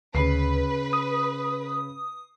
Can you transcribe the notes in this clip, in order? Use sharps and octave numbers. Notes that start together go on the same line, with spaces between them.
D2 C#3 B4 C7
D#6